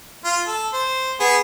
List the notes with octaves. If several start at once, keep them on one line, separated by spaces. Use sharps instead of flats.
F4
A4
C5
B3 G#4